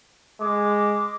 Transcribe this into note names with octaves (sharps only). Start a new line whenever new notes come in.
G#3 D6